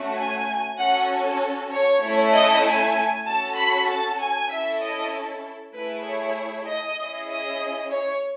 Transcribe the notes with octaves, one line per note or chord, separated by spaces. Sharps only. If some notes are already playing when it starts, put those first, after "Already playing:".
Already playing: A3 C#4 F#4
G#5
C#4 F#4 A4 F#5
C#5
A3 C#4 E4 A4
D#5
G#5
C#4 F#4 A4 A5
B5
A5
G#5
C#4 E4 A4 E5
D#5
A3 E4 G#4 B4
C#5
D#5
C#4 E4 G#4
D#5
C#5